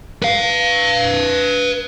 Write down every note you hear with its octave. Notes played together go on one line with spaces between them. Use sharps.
B4 F5